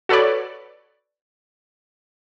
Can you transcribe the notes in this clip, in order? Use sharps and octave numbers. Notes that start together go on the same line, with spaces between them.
F#4 A4 B4 C#5 D5